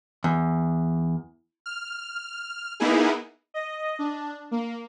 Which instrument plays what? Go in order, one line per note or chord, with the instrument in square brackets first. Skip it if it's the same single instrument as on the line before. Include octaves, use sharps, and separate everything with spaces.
[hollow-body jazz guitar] E2
[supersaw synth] F6
A#3 B3 D#4 E4 G#4
D#5
D4
A#3